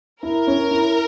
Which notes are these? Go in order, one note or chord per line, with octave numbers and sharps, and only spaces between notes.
E4 A#4
C#4
E4